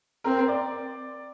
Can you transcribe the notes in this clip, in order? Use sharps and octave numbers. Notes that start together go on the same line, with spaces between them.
C4 A#4
D5